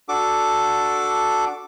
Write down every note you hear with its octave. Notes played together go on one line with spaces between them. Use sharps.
D4 F#4 A4 D6